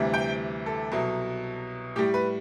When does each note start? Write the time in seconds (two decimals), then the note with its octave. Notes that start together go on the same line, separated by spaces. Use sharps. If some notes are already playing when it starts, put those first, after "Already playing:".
Already playing: D2 C3 E3 G3
0.14 G5
0.66 A4
0.92 C2 B2 F#3
1.96 A2 G3 G4
2.14 B4